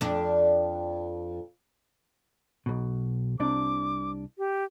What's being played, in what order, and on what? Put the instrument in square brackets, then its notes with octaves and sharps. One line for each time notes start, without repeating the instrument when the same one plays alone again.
[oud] F2 D4
[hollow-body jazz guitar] B1 B2
[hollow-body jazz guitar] C2 C3 D4 [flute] D6
[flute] G4